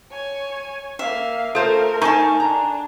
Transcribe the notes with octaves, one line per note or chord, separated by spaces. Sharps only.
C#5 G#5
A#3 E5 F5
A3 F4 A4 A#4 C5
D#4 G#5 A5 C#6
D4 A#5